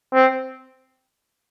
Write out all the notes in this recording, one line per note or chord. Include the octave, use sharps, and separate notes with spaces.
C4